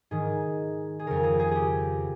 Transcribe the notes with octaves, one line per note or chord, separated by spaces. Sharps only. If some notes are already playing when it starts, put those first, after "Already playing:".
G#2 D#3 G#4
G#4
F2 C#3 A#4
G#4
G#4
G4 G#4